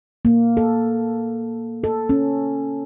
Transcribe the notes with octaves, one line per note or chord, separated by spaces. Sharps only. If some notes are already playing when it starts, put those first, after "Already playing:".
A#3
A4
A4
C#4